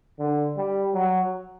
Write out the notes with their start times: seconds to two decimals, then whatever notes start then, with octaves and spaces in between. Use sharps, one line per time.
0.19 D3
0.58 G3
0.94 F#3